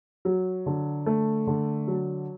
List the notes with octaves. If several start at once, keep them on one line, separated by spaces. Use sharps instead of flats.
F#3
D3
A3
D3
F#3